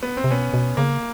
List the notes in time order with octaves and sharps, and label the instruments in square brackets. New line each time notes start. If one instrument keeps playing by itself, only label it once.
[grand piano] B3
C4
[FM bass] C3
[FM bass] B2 [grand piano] B3 C#4
[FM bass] B2
[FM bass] C#3 [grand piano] A#3